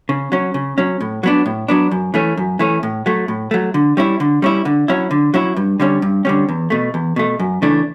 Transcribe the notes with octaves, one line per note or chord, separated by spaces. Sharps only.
C#3
F#3 C#4
C#3
F#3 C#4
A2
F#3 B3 D4
A2
F#3 B3 D4
F#2
E3 A3 C#4
F#2
E3 A3 C#4
A2
F#3 A3
A2
F#3 A3
D3
G3 C#4 E4
D3
G3 C#4 E4
D3
F#3 C#4 E4
D3
F#3 C#4 E4
G2
D3 G3 C#4
G2
D3 G3 C#4
E2
B2 A3
E2
B2 A3
F#2
C#3 E3 A3 D4